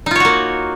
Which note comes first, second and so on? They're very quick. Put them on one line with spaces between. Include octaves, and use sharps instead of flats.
D#4 F4 C#5 F#4 A#3